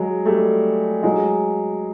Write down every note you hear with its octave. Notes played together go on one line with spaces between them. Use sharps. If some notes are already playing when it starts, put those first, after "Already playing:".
Already playing: F#3 G#3
G3 A3
F#3 G#3